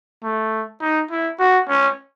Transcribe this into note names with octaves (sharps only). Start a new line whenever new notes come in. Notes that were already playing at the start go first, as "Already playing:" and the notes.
A3
D#4
E4
F#4
C#4